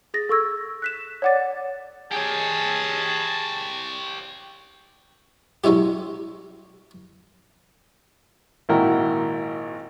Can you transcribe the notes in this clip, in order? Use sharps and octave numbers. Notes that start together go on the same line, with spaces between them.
G#4 A6 A#6
A4 C#6 E6 G#6
F#6 B6 E7
C#5 D5 F#5 D6 A6
G4 G#4 C#5 A5
F#3 G#3 C#4 E4 G4
G#1 A#2 E4 F#4 A#4 G5